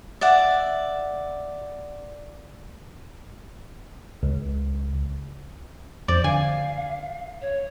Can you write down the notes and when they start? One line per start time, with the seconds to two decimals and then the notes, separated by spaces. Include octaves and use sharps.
0.21 D5 E5 F#5
4.23 C#2
6.08 F2 C5 D5
6.24 D3 F5 G#5
7.42 C#5